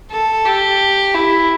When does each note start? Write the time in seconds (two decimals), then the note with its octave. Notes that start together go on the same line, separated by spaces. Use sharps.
0.11 A4
0.45 G4
1.14 E4